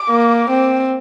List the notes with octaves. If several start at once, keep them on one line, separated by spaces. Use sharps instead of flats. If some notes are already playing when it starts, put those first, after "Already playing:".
Already playing: D6
A#3
C4